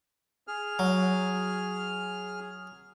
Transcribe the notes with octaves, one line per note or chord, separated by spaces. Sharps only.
G#4 F6
F#3